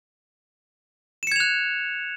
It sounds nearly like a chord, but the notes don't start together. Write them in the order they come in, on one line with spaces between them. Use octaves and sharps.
E7 C#7 G#6 F7 F#6